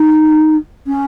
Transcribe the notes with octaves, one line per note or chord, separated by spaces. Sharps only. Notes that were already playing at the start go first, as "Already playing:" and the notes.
Already playing: D#4
C#4